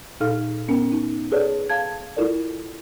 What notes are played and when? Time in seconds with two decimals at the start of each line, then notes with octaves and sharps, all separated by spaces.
0.20 A#2 D#4 A4 F5 F6
0.68 B3 C#4 A#4
0.92 D#4
1.32 G#4 A4 B4 C#5 D5 A5
1.69 F5 A5 G#6
2.16 E4 F4 A4 A#4 D5